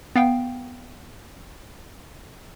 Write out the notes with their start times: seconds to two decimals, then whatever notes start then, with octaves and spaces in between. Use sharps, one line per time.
0.16 B3 F5 G5